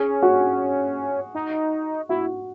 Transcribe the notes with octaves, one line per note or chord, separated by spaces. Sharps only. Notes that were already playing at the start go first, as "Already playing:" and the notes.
Already playing: C#4 G#4
F#4
D#4
E4 F#4